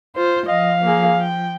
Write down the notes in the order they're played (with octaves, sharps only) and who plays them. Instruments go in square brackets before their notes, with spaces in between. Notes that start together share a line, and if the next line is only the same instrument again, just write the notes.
[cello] F4 [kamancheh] C5
[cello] F3 [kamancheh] D#5 [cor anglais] F5
[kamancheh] A#3 G#4
G5